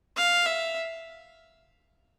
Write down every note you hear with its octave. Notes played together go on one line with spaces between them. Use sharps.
F5
E5